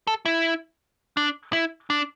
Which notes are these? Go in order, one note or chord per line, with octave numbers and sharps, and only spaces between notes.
A4
E4
D4
E4
D4